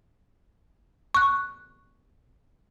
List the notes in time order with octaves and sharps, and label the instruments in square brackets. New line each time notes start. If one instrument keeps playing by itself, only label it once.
[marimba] C#6 F#6